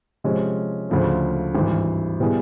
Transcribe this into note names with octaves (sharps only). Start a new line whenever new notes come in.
C3 F3 G#3 C#4
D2 C#3 F3 A3
G#1 G2 E3
B2 G3 B3 E4 G#4